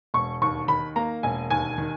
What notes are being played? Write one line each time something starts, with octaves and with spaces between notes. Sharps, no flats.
E1 C#6
D#2 C#6
D#3 B5
A#3 A#5
E1 G#5
D#2 G#5
D#3